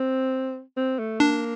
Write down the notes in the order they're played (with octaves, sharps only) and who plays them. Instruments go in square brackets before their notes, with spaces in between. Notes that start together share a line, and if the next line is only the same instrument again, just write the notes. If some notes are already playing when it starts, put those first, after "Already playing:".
Already playing: [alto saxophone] C4
C4
A3
[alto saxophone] A#3 [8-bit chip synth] D4